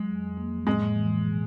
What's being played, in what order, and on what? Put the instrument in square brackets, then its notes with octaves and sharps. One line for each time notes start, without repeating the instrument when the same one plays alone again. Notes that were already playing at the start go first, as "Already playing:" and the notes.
Already playing: [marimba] F#3 [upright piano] G#3
[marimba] F2
F2
A#3
F3
[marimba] A2 [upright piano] G#3
[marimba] A2
E3
E3
B2